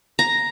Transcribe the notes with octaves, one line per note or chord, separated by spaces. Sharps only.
A#5